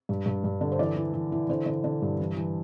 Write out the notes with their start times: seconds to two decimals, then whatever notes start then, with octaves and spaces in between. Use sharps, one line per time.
0.09 G2
0.26 G2
0.44 G2
0.61 D3
0.72 C5
0.79 E3 D5
0.96 E3
1.13 E3
1.32 E3
1.49 D3 C5
1.66 D3
1.84 D3
2.02 G2
2.20 E3
2.36 E3